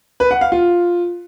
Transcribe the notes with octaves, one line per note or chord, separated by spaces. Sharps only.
B4
F#5
F5
F4